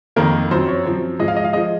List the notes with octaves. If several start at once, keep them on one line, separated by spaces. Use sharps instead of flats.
F2 D#3 A#3 A#4
F#2 F3 C4 C5
C#5
F#2 F3 C4
G#2 F3 G#3 D#5
F5
D#5
F5
F3 G#3 D#5